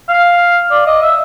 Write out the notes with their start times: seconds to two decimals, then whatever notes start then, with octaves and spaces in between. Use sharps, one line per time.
0.09 F5
0.71 D5
0.86 D#5
1.02 E5